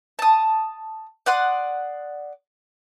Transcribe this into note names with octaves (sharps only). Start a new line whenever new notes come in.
A5 D#6
D5 F#5 C6 D#6